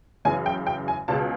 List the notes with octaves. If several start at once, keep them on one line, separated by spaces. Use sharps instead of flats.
F#2 C#3 E3 G#5
G5
G5
G#5
C#2 B2 G#3 A5